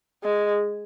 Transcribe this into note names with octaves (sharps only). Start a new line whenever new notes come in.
G#3